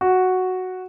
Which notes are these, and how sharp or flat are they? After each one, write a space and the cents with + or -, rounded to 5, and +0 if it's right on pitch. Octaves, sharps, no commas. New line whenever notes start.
F#4 +0